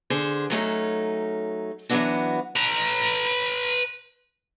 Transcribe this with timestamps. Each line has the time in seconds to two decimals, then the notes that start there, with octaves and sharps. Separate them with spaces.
0.10 D3 G#4 C5
0.50 F#3 A3 C#4 D#4
1.89 E3 F#3 A#3 B3 D4 F#4
2.56 B4 A#5